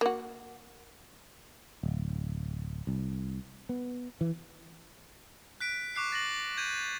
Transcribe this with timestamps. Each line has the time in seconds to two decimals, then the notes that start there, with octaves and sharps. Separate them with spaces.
0.01 A#3 F#4
1.83 D1
2.87 C2
3.69 B3
4.21 E3
5.61 F#6 B6 D7
5.96 C#6 D6 F#6 C7
6.12 A6 A#6 F#7
6.57 G6 G#6 D#7